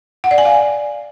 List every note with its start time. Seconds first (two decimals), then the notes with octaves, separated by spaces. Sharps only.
0.24 F#5
0.31 D5
0.38 G#5
0.45 F5
0.52 D5